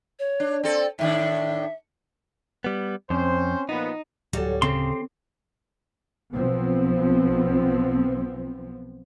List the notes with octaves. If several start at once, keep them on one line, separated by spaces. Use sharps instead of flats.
C#5
D4
C4 A4 D5
A2 D#3 D4 E5
G3 B3
F2 C4 C#4 C5
A#2 F3 B3 D#4
D1 F#3 G3 C#4 A4
C#3 C4 G4 A4 C#5 C6
B1 B2 F3 B3 C4